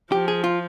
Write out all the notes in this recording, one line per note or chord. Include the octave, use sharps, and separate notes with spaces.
F3 G4
G#4
F4